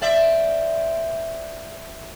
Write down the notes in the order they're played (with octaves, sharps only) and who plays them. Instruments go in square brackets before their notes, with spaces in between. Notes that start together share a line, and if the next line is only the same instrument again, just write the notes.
[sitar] C4 D5 E5